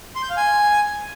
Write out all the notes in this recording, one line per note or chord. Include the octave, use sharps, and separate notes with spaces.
C6
G6
F5
G#5